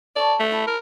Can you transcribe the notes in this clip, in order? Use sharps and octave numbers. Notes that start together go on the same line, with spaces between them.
A4 C#5 D5
A3
E4 A5
A#4